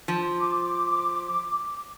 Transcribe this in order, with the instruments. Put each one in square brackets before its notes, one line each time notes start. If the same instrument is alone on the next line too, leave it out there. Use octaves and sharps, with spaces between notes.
[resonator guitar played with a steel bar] F3
[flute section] D6